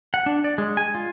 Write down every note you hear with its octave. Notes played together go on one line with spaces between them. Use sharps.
F#5
D4
D5
G#3
G#5
F4